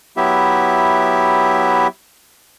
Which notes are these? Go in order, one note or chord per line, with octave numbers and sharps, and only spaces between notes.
F#3 B3 E4 G4 E5